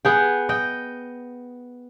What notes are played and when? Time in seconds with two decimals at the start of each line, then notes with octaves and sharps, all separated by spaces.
0.05 B3 G#4 G5
0.49 D#5 G5